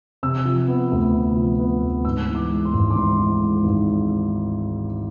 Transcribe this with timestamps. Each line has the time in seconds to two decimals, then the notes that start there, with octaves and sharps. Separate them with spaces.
0.23 C3 E6
0.45 F3
0.68 B3
0.91 D2
1.13 C3
1.37 F3
1.59 B3
1.81 D2
2.05 G#2 E6
2.28 E3
2.35 D6
2.50 G#3
2.65 C6
2.73 G#1
2.90 D6
2.96 G#2 C6
3.18 E3
3.41 G#3
3.64 G#1